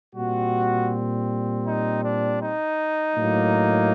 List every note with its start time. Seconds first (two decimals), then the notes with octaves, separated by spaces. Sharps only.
0.15 A#2 G3 C4 F#4
1.65 D#4
2.03 D4
2.40 D#4
3.15 A2 F#3 A#3